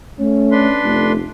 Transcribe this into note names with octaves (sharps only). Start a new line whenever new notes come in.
A3 C#4
D4 B4 C6
F1 A3